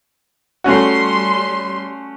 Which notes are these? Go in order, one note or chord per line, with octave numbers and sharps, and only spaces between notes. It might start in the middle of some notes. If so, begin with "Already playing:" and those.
G3 A3 C#4 F#4 C6